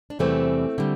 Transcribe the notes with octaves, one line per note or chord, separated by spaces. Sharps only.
D4
E2 C3 E3 G3 A3 C4
D3 G3